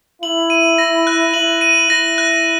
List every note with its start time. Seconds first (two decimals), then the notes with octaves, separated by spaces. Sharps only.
0.22 E4 F#7
0.50 D#7
0.78 A#6
1.07 F#6
1.34 E4 F#7
1.61 D#7
1.89 E4 A#6
2.18 F#6